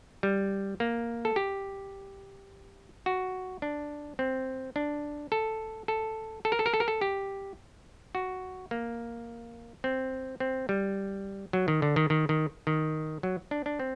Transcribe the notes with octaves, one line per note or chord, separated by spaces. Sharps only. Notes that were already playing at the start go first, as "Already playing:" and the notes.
G3
A#3
A4
G4
F#4
D4
C4
D4
A4
A4
A4
A#4
A4
A#4
A4
A#4
A4
G4
F#4
A#3
C4
C4
G3
F#3
D#3
D3
D#3
D#3
D#3
D#3
F#3
D4
D4
C4